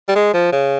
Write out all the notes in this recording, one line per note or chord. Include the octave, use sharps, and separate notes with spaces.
G3
G#3
F3
C#3